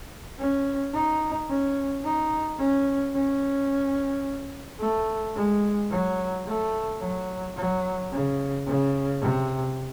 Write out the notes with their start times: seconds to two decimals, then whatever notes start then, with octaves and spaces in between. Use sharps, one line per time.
0.39 C#4
0.93 D#4
1.49 C#4
2.04 D#4
2.59 C#4
3.14 C#4
4.80 A3
5.35 G#3
5.90 F#3
6.46 A3
7.00 F#3
7.56 F#3
8.11 C#3
8.67 C#3
9.21 C3